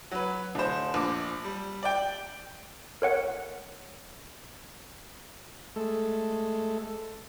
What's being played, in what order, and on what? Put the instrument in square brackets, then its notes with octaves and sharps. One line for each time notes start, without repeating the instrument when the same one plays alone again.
[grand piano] F#3 B4
D1 C5
A#1 D6
G3
D5 G5
[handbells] A#4 C#5 F#5
[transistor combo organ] G#3 A3 A4